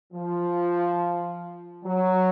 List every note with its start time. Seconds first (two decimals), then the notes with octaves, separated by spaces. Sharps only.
0.13 F3
1.84 F#3